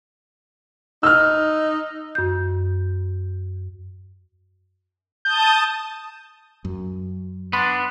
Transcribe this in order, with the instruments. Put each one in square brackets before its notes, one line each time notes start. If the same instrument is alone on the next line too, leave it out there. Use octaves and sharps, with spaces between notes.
[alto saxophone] D#4 [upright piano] E6 F6
[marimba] F#2 G6
[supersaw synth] A5 D#6 [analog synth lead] G6
[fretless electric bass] F#2
[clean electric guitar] B3 [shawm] D4 [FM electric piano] B5 C6